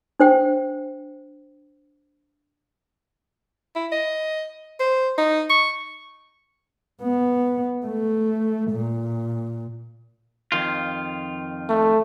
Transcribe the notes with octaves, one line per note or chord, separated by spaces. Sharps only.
D4 C5 G5
E4
D#5
C5
D#4
C#6
B3
A3
A#2
F2 D#3 F4
A3